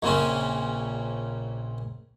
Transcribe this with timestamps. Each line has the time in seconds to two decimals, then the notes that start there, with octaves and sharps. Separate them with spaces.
0.03 A#1 A#2 C#3 C4 C#4